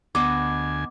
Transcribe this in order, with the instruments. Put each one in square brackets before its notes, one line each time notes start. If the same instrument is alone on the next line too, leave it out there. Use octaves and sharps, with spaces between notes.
[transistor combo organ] D2 G#5 [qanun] B3 D#5 [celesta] D6